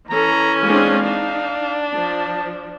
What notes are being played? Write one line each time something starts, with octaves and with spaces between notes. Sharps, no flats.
E3 C#4 A4 A#5
G#3 C4 D4 F5
D4 D#4
F3 A5